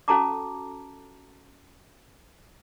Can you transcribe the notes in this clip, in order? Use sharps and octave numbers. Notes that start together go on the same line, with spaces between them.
C#4 F#4 A4 A5 A#5 D6